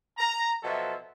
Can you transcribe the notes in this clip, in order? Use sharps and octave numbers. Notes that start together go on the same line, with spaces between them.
A#5
B2 F3 F#3 A4 E5